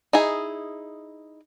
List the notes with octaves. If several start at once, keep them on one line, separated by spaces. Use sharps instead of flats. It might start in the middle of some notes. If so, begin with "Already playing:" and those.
D#4 E4 G#4